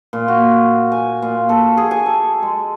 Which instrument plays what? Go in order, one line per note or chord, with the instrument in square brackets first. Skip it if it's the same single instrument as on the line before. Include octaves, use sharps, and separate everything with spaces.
[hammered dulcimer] A#2
F#4
G#5
A#2
A4
G#4
G#5
A4
G#3